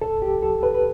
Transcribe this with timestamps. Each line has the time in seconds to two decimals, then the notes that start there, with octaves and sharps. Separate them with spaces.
0.02 C#2 A4
0.22 G4
0.42 C#2 A4
0.63 B4
0.74 B4